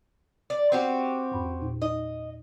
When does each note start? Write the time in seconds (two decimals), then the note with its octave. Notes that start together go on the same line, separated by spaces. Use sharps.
0.50 D5
0.72 C4 F#4 G4
1.31 E2 G#2 B5
1.61 A#2 D#4
1.82 D#4 D#5